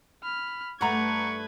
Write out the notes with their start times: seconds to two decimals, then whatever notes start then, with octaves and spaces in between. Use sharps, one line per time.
0.24 B5 F6
0.81 G2 A3 B4 F#5 A#5 C#6 G#6